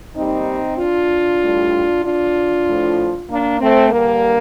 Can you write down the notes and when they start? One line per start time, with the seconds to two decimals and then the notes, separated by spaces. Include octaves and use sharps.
0.16 D#2 D#3 G3 C4 D#4
0.78 D4 F4
1.40 A2 G3
2.03 D4 F4
2.67 A2 F3
3.28 A#3 D4
3.60 A3 C4
3.91 G2 D3 G3 A#3